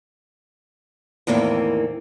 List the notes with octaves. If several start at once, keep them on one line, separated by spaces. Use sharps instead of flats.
E2 A2 D#3 E3 A#3 C4